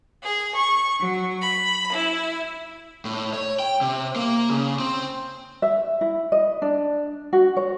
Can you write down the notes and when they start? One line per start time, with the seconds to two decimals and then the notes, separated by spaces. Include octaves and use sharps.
0.24 G#4
0.56 C#6
1.01 F#3
1.42 B5
1.93 E4
3.05 A2
3.33 C#5
3.60 G5
3.81 C3
4.16 A#3
4.50 C#3
4.79 C4
5.62 E5
6.01 E4
6.32 D#5
6.62 D4
7.33 F#4
7.57 C#5